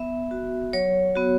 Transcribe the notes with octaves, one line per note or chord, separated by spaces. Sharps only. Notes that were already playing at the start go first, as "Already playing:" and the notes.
Already playing: B3 E5
F#4
F#3 C#5
B3 F#4